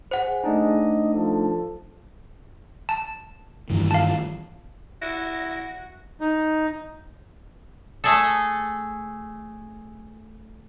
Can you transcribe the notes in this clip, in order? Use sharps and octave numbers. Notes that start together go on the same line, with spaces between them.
G#4 C5 F#5
A3 D4 D#4 D#5
F3 A4
A5
G2 D#3 E3
F5 A5
E4 F#4 A#6
D#4
A3 G#4 A4